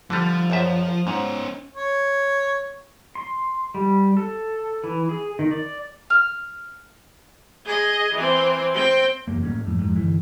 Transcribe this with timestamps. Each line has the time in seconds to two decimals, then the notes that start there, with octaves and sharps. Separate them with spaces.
0.10 D3 F3 G3
0.50 A#1 F#2 E5
1.07 G#2 C#4 C5
1.76 C#5
3.15 C6
3.74 G3
4.17 A4
4.84 E3
5.09 G#4
5.39 D#3
5.51 D5
6.10 F6
7.65 G#4 D#5
8.14 E3 C4
8.74 C4 G5
9.28 F#1 E2 A#3
9.43 A2 A#3 C#4
9.65 F2 A2
9.79 F2 G#2
9.96 G1 C2 E3